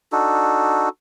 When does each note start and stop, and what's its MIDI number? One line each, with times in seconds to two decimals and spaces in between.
0.12 0.89 62
0.12 0.89 63
0.12 0.89 66
0.12 0.89 69